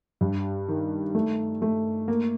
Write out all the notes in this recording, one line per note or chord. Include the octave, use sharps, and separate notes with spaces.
G2
D#3
A3
A3
A#3